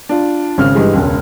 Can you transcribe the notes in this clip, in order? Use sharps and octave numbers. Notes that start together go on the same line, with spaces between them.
D4 F4
G#1 C#3 F6
G2 E3 G#3
E1 C#2